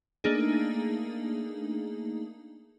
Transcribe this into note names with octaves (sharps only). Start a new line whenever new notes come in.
A3 A#3 D4 D#4 G#4